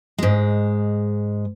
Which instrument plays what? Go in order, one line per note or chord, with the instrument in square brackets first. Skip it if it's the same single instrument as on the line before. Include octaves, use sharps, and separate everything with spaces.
[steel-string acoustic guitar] G#2 G#3